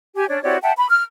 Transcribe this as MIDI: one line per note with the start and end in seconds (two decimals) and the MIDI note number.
0.16 0.26 67
0.16 0.26 80
0.29 0.43 61
0.29 0.43 62
0.29 0.43 73
0.29 0.43 74
0.44 0.58 60
0.44 0.58 64
0.44 0.58 66
0.44 0.58 67
0.44 0.58 73
0.44 0.58 74
0.63 0.73 76
0.63 0.73 78
0.63 0.73 79
0.63 0.73 81
0.78 0.87 83
0.90 1.03 89